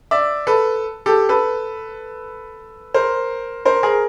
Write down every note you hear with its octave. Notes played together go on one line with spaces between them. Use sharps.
D5 E5
A4 B4
G4 A4
A4 B4
A#4 C5
A#4 C5
G#4 A#4